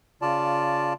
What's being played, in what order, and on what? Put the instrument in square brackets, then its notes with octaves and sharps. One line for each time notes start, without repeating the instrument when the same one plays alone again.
[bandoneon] C#3 F4 D5 A5